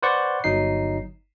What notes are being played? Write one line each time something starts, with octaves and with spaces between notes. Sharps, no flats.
B4 C5 D5 F#5 C#6 G6
G1 F#3 D#4 C7